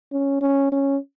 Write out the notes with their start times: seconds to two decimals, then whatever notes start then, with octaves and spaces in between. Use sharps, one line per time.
0.12 C#4
0.41 C#4
0.72 C#4